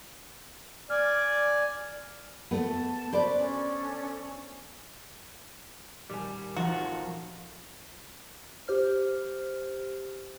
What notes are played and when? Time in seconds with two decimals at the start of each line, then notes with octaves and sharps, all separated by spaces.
0.90 D5 G#5 F6
2.51 A3 B3 A5
3.13 F#4 B4 C5 D5 B5
3.38 C#4 D4 A4
6.10 D#1 G3 G#5
6.57 F2 D#3 F3 F4 F#4 A5
8.68 G4 C5 F6